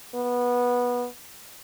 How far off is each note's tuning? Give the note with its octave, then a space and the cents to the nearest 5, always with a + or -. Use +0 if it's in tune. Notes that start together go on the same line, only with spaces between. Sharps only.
B3 -15